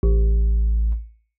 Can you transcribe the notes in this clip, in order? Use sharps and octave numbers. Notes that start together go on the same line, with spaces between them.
A1